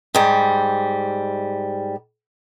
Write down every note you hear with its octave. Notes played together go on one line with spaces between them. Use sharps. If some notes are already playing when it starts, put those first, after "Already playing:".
G#2 G3